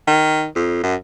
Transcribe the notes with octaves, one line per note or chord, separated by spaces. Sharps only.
D#3
F2
F#2